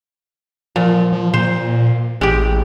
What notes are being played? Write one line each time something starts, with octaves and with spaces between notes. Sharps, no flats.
A#2 F3
F3
A#2 C5
A1 G#3 G4